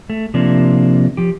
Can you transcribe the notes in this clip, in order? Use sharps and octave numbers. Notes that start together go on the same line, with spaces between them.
A3
C3 F3 A#3 D4
F3 G4